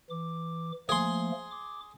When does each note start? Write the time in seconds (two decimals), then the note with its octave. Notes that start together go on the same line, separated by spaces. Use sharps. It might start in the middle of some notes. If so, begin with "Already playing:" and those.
0.10 E3 D6
0.89 F3 A3 A#3 G#4 C6
1.51 D6